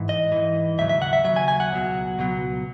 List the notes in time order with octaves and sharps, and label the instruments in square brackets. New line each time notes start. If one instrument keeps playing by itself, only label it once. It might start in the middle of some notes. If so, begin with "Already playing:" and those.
Already playing: [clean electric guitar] G#2 E3
D#5
G#2 E3
D#2 C#3 F#3 E5
E5
F#5
E5
D#2 C#3 F#3 E5
G#5
G#5
F#5
C#2 B2 F#3
C#2 B2 F#3